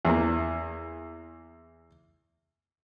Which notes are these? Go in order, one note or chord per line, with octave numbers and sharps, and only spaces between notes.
E2 A#3